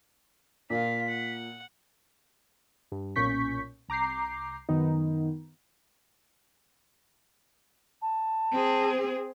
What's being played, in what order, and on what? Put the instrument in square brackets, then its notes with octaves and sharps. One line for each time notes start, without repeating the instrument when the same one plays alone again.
[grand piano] A#2 [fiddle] F4 F5 [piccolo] B6
[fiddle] F#5
[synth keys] G2
B1 A#2 C#4 C#6 G6 B6
C2 A#5 D6 G6 C7
F#2 D#3 B3 D#4
[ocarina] A5
[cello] C4 G#4